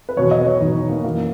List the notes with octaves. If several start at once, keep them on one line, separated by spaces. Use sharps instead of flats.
B4
E2 B2 F#3 C#5
D#5
B4
C#5
E2 B2 F#3 D#4
D#4
A#3
F#2 E3 A#3